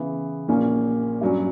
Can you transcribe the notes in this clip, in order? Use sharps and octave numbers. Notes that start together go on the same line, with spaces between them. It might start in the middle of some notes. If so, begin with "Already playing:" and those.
Already playing: C#3 E3 B3
A#1 A#2 A#3 C#4
G2 F#3 C#4